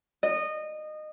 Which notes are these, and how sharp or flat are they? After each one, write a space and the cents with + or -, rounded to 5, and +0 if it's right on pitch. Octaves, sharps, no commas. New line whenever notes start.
D#5 -20